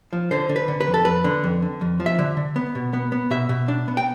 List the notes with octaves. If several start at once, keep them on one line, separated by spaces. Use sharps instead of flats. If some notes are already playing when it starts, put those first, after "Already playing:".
F3
D3 C5
D3
B4
D3
B4
F2
A4
F2 B4
D3
F2
D3
F2
F3
E5
D3
D3
B3
B2
B3
B3
B2 E5
B2
D4
B3
G5